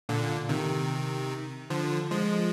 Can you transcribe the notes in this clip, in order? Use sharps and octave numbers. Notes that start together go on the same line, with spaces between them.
A#2 D3
C3 D#3
D3 F3
F3 G#3